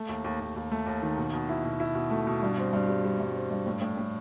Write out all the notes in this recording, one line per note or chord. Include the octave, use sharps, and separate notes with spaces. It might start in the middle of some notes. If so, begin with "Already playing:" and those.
Already playing: A3
D#2
D#2
D#2
D#2
A3
D#2
D#3
B2
B2
E4
B2
E4
B2
A3
B2
G2
C4
G2
G3
G3
G2
C4
G2
A2
A2
A2